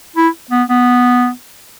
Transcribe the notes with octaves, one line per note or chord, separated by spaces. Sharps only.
E4
B3
B3